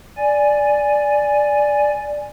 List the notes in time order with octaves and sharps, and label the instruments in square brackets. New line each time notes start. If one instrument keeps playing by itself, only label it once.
[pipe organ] D5 G#5